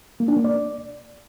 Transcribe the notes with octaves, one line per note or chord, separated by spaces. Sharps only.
A#3
D4
A#3
D5